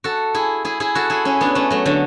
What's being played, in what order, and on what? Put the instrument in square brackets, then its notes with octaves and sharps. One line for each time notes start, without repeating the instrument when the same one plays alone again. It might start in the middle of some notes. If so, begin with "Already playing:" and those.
[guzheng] F#4 A4
E4 G#4
E4 G#4
E4 G#4
F#4 A4
E4 G#4
C#4 E4
B3 D4
A3 C#4
F#3 A3
D3 F#3